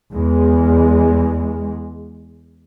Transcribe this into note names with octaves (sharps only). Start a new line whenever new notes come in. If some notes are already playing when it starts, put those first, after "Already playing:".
E2 G#3